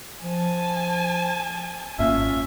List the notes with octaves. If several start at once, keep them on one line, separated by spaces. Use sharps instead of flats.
F3 G#5 A5
G#1 F#2 A#3 C#4 F4 E5